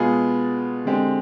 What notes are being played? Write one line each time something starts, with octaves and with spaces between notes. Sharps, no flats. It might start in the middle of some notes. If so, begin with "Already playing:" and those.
Already playing: B2 G#3 B3 F4 G#4
D3 G#3 C4 G4